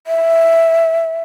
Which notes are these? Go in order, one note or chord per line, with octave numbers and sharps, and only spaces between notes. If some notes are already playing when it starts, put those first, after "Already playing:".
E5